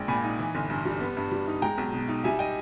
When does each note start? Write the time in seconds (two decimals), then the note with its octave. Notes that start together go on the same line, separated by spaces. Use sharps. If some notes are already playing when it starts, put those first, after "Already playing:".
Already playing: A#1 G#3 G5
0.08 A#2 G#5 B5
0.24 D#4
0.39 E3
0.55 G1
0.70 G2
0.85 G3
1.01 B3
1.17 G2
1.31 G3
1.47 D#4
1.62 G#3 G5 A#5
1.78 B1
1.94 B2
2.08 D#4
2.24 G3 E5 G#5
2.39 D#5 G5